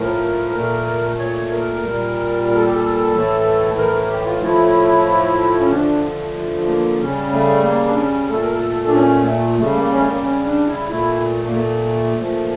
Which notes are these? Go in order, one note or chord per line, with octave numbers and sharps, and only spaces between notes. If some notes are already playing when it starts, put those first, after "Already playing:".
Already playing: A2 F3 A3 A#4
A#2 A3
C#5
A#4
A#2 G3
A#4
A4
G4
A4
A2 E3 A3
A#4
A#4
G4
F4
A2 F3 A3 E4
C#4
D3 F3 A3 D4
A3
A3
A#3
C#3 G3 C#4
A3
A#3
D4
C#4
A#2 A3 A4
A#4
A4
D4
C#4
A3
C#3 G3 A3
A#3
C#4
A3
A#3
C#4
D4
E4
A#2 A3 E4
A#3
A3
A#2 F3 A3